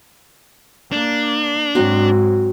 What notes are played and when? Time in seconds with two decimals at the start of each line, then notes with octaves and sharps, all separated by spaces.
0.92 A#3 D4
1.75 G#2 F#3 C4 F#4